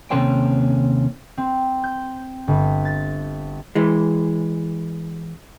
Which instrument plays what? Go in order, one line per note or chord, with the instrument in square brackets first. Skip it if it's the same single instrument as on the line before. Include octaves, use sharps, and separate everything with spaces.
[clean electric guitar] D#2 C3 C#4 A4 C5 G5
[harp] C4
G6
G1
A6
[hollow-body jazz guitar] E3 G#3